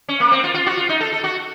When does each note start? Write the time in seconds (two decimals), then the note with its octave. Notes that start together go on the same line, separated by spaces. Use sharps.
0.08 C#4
0.20 A#3
0.32 C4
0.44 F4
0.54 F4
0.66 F#4
0.77 F4
0.89 D#4
1.01 A4
1.12 A4
1.24 F#4